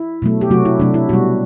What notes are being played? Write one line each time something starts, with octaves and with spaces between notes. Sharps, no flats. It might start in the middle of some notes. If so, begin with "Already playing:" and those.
Already playing: E4
B2 F#3 A3
G4
C3 F#3 A3 F#4
E4
C3 F#3 A3 D4
E4
B2 G3 F#4